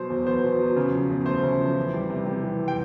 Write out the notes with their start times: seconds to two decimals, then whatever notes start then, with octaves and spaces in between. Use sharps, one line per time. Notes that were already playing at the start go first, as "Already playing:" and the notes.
Already playing: B2 F#3 C5
0.10 E2
0.26 B3 C5
0.43 B2
0.60 F#3
0.76 C#3
0.93 F3
1.10 E2
1.26 A3 C5
1.44 C#3
1.59 F3
1.77 E3
1.94 G3
2.10 C3
2.26 C3
2.43 E3
2.59 G3
2.68 G5